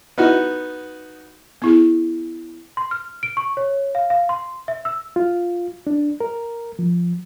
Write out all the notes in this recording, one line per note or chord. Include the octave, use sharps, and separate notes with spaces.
B3 D#4 F#4
B3 E4 G#4
C6
F6
D7
C#6
C#5
F5
F5
C6
E5
E6
F4
D4
A#4
F3